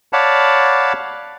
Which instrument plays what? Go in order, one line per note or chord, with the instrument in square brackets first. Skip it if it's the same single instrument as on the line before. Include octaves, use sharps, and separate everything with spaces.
[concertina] C#5 D5 F5 F#5 A5 B5